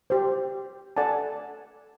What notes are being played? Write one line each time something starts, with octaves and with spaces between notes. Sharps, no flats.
G4 C5
A4 D5 F#5 G#5 A5